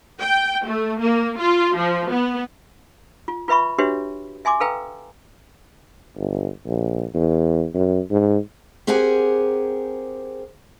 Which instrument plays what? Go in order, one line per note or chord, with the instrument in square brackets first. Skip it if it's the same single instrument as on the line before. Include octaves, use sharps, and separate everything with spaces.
[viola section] G5
A3
A#3
F4
F3
B3
[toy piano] F4
F4 B4 E5 B5 C#6
D4 F#4 G4 B4 C#5 E5
E5 G#5 C6 D6
A4 B4 F5 G5 A#5 E6
[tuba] G1
A#1
E2
F#2
G#2
[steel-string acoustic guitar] C4 G4 G#4 A#4 F#5 G#5